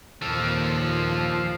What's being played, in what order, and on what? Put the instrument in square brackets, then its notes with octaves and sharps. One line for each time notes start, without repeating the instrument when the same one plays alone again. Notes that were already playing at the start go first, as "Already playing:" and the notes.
[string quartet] D#2 A#2 [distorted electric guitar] F3 A4